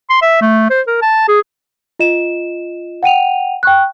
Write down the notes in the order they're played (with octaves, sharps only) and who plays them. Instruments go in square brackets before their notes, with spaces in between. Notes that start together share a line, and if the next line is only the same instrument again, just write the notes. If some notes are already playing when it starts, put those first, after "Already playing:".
[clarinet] C6
E5
A3
C5
A#4
A5
G#4
[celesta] F4 D#5 E7
F#5 G5 D#7 F7
G5 C#6 F#6